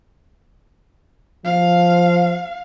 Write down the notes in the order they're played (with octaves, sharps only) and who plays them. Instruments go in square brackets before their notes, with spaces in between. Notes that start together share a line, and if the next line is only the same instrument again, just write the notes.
[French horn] F3 [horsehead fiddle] F5